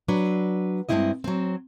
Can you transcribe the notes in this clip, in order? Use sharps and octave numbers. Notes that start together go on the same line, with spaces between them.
F#3 D4 B4
G2 F3 G#3 C4 E4 D#5
F#3 C4